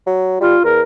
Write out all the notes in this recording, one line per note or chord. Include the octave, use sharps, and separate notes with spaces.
F#3
G3 F4
E2 A#4